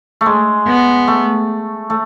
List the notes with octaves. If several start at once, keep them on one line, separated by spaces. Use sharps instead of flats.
A3
G#3
B3
A3
A3